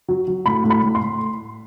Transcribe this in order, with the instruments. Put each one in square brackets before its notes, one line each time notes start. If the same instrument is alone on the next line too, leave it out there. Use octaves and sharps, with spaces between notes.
[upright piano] F#3
F#3
A2 B5
A2
B5
A2
C6
A2